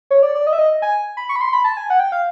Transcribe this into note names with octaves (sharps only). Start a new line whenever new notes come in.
C#5
D5
D5
D#5
E5
D#5
G#5
B5
C#6
B5
C6
B5
A5
G#5
F#5
G5
F5